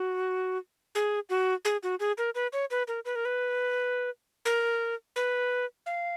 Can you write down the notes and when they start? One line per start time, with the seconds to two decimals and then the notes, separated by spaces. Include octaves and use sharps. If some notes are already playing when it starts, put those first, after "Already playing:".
Already playing: F#4
0.95 G#4
1.30 F#4
1.65 G#4
1.83 F#4
2.00 G#4
2.18 A#4
2.35 B4
2.53 C#5
2.71 B4
2.88 A#4
3.05 B4
3.16 A#4
3.25 B4
4.45 A#4
5.16 B4
5.86 F5